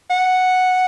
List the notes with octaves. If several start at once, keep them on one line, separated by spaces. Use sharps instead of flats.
F#5